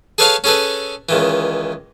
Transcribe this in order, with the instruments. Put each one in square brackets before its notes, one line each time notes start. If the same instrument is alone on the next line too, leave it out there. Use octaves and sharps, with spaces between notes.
[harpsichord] G#4 A4 B4 C#5 F5 A5
C#4 G#4 A4 B4
C#2 D#3 E3